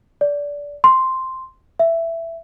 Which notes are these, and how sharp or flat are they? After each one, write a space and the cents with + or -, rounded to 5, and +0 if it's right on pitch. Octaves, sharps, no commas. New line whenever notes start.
D5 -20
C6 +0
E5 +10